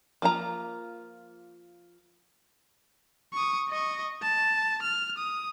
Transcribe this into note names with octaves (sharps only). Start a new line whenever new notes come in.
F3 A#3 F4 A#5
C#6 D#6
D#5 C#6
A5
F6
D#6